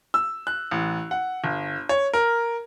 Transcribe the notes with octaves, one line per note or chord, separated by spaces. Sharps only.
E6
F#6
A1
F#5
G1
C#5
A#4